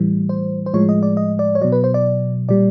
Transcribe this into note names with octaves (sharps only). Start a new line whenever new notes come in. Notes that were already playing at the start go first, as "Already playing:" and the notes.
Already playing: A2 E3 G3
C5
C5
A2 F3 G#3 C#5
D#5
D5
D#5
D5
C#5
B2 F#3 D5
B4
C5
D5
A#2 G3 D5